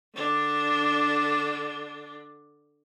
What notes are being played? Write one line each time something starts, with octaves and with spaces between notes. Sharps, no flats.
D3 D4